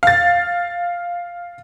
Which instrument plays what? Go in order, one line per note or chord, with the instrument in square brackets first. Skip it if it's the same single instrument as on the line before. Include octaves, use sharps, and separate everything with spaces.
[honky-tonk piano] F5 A6